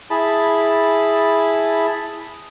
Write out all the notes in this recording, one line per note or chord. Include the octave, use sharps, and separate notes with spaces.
E4 G#4 A5 B5